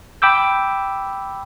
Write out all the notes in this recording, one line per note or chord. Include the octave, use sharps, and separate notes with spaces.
G5 B5 D6 E6 G6